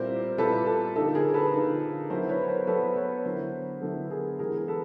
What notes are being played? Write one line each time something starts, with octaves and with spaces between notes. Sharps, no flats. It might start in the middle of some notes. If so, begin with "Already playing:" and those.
Already playing: A#2 G3 C4 E4 A#4 C5
A#2 G3 C4 E4 A4 B4
A4
D3 F3 A#3 D#4 A4
G#4 A#4
A4 B4
D3 F3 A#3 D#4
F#3 B3 E4 A#4 C5
B4 C#5
A#4 C5
F#3 B3 E4 A4 B4
B4 C#5
D3 F#3 B3 E4 A#4 C5
D3 F#3 B3 E4 A4
G#4 A#4
E3 G#3 B3 G#4 A#4
A4 B4